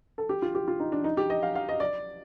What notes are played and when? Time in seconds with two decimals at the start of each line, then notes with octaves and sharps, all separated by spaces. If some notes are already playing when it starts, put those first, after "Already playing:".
0.18 A4
0.29 G4
0.42 F4
0.55 G4
0.68 F4
0.80 D#4
0.92 D4
1.04 D#4
1.17 G4
1.30 D#5
1.43 F5
1.55 F5
1.69 D#5
1.80 D5